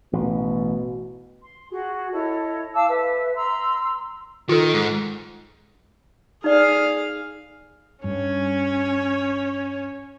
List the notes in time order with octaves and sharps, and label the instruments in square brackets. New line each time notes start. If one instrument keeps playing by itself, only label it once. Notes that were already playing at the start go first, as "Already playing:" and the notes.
[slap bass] A1 [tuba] B2
[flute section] C6
F#4 G#4
E4 A4 C#5 D#5
F5 A5 D6 E6
A4 B4 E5
A#5 C6 E6
[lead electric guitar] D#3 [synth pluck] F4 A4
[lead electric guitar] G#2
[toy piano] D#4 D5 [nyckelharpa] G#4 F5
[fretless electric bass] G2 [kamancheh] C#4 C#5